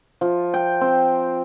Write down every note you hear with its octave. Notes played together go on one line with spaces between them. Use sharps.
F3
G5
C4